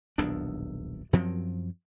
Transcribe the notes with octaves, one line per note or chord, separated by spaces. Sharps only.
D#1 B1 E2 D4
F#2 F3 F#3 C4